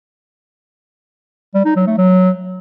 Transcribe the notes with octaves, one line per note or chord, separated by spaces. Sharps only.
G3
D#4
F#3
A3
F#3